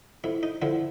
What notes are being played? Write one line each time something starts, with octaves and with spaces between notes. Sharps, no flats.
F2 E4
D#4
D3 F3 E4